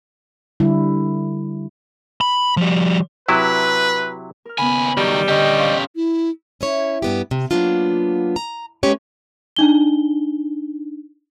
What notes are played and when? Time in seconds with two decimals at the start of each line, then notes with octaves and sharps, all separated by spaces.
0.60 D3 G3 E4
2.21 B5
2.57 F3 G3
3.28 C3 F#3 E4 B4
4.45 A#4 F6
4.58 D#2 C#3 B3 G#5 B5
4.97 D#3 F#3 G3
5.28 D3 C#4 G4 D#5
5.59 C5 F5 C#6
5.96 E4
6.61 C#4 E4 C#5
7.02 G2 B3 G4
7.31 C3
7.51 F#3 G3 A#3 B3 D4 F4
8.36 A#5
8.83 G#3 A3 C#4 G4 B4 C#5
9.56 D4 D#4 G7